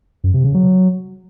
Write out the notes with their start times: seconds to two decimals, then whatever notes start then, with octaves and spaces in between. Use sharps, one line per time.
0.24 F#2
0.34 C3
0.44 C#3
0.54 F#3